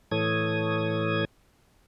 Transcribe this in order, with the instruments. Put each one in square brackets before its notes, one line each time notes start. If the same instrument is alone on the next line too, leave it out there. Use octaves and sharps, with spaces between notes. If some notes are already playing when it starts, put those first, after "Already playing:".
[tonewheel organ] A2 E3 A4 C#5 D#6 G#6